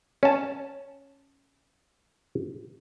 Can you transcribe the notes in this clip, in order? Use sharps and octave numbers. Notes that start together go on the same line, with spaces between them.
C#4 A5